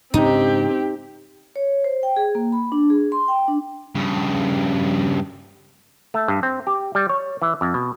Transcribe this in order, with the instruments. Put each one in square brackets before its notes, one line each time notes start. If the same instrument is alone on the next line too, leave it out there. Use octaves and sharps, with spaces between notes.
[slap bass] G#2 C#3 D4 [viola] C4 G4 [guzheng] D#4
[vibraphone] C#5
C5
G5
G#4
A#3
B5
D4
G#4
C6
G5
D4
[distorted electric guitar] G2 C#3
[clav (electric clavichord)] A3
G2
C4
G4
G3
C#5
E3
F2
B2